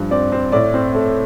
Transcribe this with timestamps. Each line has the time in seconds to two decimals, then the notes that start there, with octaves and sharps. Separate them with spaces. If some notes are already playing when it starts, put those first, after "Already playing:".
Already playing: G2 F3
0.11 C4 D5
0.32 C4
0.52 A2 D5
0.74 C4
0.94 A3